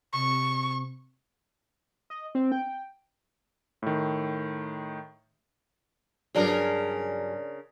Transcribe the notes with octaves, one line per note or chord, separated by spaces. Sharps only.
C3 C#6
D#5
C4
G5
A2 D#3
G2 C#3 F#3 D4 G#4 A#4